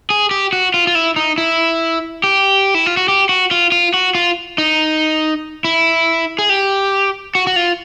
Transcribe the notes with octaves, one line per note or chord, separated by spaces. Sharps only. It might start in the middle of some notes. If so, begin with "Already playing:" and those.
G#4
G4
F#4
F4
F4
E4
D#4
E4
G4
E4
F4
F#4
G4
F#4
F4
F4
F#4
F4
D#4
E4
G#4
G4
F#4
F#4
F4